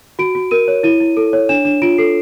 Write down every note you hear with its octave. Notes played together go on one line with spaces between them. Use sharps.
F#4 D7
F#4
A#4 D#7
C#5
E4 D#7
E4
A4
C#5
D4 E7
D4 E7
F4 D7
A4 C7